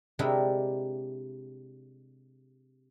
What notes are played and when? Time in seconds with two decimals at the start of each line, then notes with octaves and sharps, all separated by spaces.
0.19 C3 G#3 D4 E4 G4 A#4